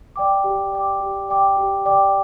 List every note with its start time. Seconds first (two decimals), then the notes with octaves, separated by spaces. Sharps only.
0.16 D5 G5 D6
0.44 G4
0.72 D5 G5 D6
1.00 G4
1.29 D5 G5 D6
1.57 G4
1.86 D5 G5 D6